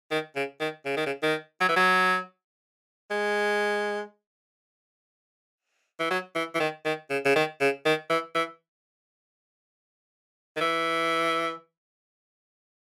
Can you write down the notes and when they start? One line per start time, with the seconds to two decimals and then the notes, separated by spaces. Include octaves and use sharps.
0.11 D#3
0.36 C#3
0.60 D#3
0.85 C#3
0.97 D#3
1.06 C#3
1.23 D#3
1.61 F#3
1.69 E3
1.76 F#3
3.11 G#3
6.00 E3
6.10 F#3
6.35 E3
6.55 E3
6.60 D#3
6.85 D#3
7.10 C#3
7.25 C#3
7.36 D#3
7.61 C#3
7.85 D#3
8.10 E3
8.35 E3
10.56 D#3
10.61 E3